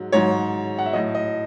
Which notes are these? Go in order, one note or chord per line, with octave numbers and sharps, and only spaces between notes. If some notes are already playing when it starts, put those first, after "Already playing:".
Already playing: G#2 F#3
G#2 F#3 C#5
F#5
E5
A2 F#3 D#5
D#5